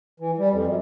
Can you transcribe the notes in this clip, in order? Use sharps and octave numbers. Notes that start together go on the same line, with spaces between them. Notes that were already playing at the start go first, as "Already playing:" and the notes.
E3
G3
F2
F#2